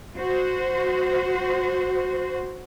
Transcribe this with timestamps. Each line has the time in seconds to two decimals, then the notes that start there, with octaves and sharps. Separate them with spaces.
0.18 F#4 C5